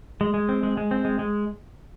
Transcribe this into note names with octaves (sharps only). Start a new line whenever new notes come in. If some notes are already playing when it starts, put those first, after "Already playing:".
G#3
G#3
C4
G#3
G#3
C4
G#3
G#3